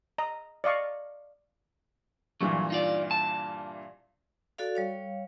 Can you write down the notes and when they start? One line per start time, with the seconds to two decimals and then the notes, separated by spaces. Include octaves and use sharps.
0.18 D#5 A#5
0.64 D5 D#5 F5 C#6
2.41 G2 A#2 E3 F#3
2.70 D#4 F4 D5
3.11 A5
4.58 F#4 A4 D5 F5
4.75 G3 C#5 F5